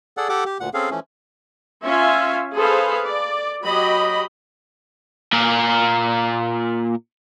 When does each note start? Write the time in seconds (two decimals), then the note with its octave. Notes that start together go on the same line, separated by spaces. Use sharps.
0.17 G#4 A4 D5 F#5
0.29 G4 A4 F#5 D6
0.46 G4
0.60 D2 A#2 F#5
0.74 C4 C#4 G#4 A4 F5
0.90 E3 F3 A3 C#4
1.85 C#4 F4 E5 F5 G#5
2.54 G#4 A4 B4 C5 F5
3.06 D5
3.64 F#3 G4 D#5 B5
5.33 A#2 A#4